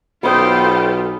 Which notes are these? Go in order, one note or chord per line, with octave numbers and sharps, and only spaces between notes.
B1 B3 F4 A4 C5 G5 B5 D#6